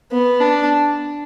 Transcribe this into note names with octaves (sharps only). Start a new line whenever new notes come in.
B3
D4